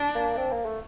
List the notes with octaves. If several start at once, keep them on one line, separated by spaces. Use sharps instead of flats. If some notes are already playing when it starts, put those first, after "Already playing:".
Already playing: D4
A#3
C4
A#3
A3